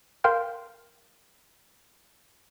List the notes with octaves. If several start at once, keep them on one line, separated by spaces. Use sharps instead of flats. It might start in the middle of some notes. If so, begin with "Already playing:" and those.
A#4 F5 G5 C6 F6 G6